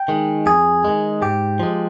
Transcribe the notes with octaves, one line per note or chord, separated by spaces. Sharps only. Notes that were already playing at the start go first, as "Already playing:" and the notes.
Already playing: G5
D#3 G#3
F2 G#4
D#3 G#3
G#2 G4
F3 G#3